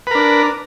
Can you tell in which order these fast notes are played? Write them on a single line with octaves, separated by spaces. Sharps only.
B4 A#4 D4